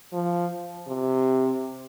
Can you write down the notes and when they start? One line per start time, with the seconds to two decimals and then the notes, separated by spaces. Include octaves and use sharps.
0.13 F3
0.87 C3